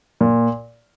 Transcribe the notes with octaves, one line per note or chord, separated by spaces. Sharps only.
A#2